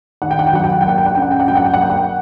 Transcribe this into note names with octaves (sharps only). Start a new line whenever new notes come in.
D#3 F#5
G5
F#5
G5
F#3 F#5
G5
F#5
G5
A#3 F#5
G5
F#5
C#4 G5
F#5
G5
F#5
F#3 G5
F#5
G5
F#5
A#3 G5
F#5